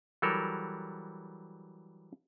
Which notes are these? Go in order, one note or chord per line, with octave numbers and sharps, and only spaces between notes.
E3 F#3 G3 A4 A#4